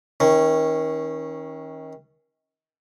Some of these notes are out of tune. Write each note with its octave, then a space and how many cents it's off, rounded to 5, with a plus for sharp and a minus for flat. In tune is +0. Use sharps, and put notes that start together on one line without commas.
D#3 +30 C#4 -15